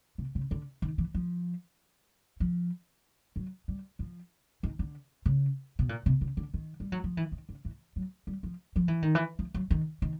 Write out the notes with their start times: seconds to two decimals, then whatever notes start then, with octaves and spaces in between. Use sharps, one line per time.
0.18 C3
0.35 C#3
0.51 D3
0.82 D#3
0.98 E3
1.14 F3
2.40 F3
3.36 F#3
3.68 G3
3.99 F3
4.63 D#3
4.79 D3
5.26 C#3
5.79 B2
5.89 A#2
6.06 C3
6.21 C#3
6.37 D3
6.54 D#3
6.80 G3
6.92 F#3
7.04 F3
7.17 E3
7.32 D#3
7.49 D3
7.65 E3
7.96 F#3
8.27 G3
8.43 F3
8.76 F3
8.88 E3
9.02 D#3
9.15 E3
9.39 F3
9.54 F#3
9.71 D#3
10.02 D#3